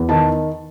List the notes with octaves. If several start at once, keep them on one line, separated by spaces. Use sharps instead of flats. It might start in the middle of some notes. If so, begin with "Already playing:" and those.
Already playing: E2
D#3 A5